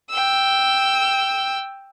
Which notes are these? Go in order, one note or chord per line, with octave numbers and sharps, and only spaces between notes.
G5 E6